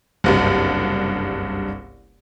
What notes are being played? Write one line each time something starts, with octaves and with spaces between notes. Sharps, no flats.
F#1 C2 G2